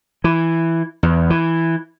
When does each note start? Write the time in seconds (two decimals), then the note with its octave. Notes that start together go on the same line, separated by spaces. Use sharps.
0.24 E3
1.03 E2
1.30 E3